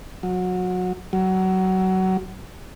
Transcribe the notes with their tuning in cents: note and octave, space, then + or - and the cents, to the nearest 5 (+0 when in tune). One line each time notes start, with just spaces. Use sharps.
F#3 -25
F#3 +20